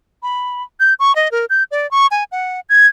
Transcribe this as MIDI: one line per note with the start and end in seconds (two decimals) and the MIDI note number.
0.23 0.63 83
0.80 0.94 91
1.00 1.15 85
1.16 1.31 75
1.32 1.45 70
1.50 1.63 91
1.71 1.89 74
1.91 2.07 85
2.11 2.24 80
2.32 2.60 78
2.69 2.87 92